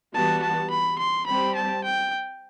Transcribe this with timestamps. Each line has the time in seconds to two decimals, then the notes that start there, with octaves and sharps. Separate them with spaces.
0.14 E3 G3 B3 F#4 A5
0.42 A5
0.70 B5
0.99 C6
1.26 G3 C4 G4 B5
1.55 A5
1.84 G5